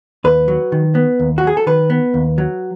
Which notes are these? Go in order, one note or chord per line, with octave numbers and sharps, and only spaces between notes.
D#2 B4
F#3
D#3
B3
D#2
F#4
F#3 G#4
A4
D#3 B4
B3
D#2
F#3